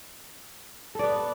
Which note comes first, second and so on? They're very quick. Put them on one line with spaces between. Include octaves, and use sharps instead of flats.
A4 D5 B3